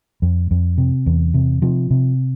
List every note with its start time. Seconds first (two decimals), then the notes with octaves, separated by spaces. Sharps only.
0.22 F2
0.51 F2
0.78 C3
1.06 E2
1.34 C3
1.62 C3 F3
1.91 C3